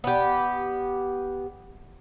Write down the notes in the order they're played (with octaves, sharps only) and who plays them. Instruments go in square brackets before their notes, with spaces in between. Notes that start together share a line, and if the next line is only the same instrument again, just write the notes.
[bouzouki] B3 G4